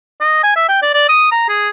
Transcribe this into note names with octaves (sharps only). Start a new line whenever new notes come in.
D#5
G#5
E5
G5
D5
D5
D#6
A#5
G#4